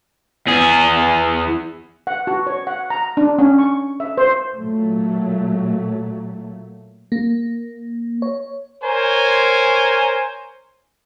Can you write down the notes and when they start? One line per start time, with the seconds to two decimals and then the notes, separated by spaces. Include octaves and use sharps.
0.47 E2 G#4
2.07 F#5
2.27 F#4
2.47 C#5
2.67 F#5
2.90 A#5
3.17 D4
3.39 C#4
3.58 C#6
4.00 E5
4.18 C5
4.55 A#2 F#3 A3
7.12 A#3
8.22 C#5
8.84 A#4 C5 C#5 G#5